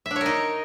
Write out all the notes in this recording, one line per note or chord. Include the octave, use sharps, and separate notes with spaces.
E5
D4
C#5
A#4
D#4